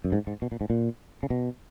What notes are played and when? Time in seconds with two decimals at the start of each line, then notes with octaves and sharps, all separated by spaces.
0.04 F#2
0.12 G#2
0.27 G#2
0.42 B2
0.52 A#2
0.61 G#2
0.70 A#2
1.23 C#3
1.30 B2